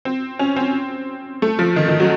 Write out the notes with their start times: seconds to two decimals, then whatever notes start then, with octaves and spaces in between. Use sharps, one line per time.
0.05 C4
0.39 C#4
0.56 C4
1.42 A3
1.59 F3
1.76 D#3
1.88 D#3
2.00 F#3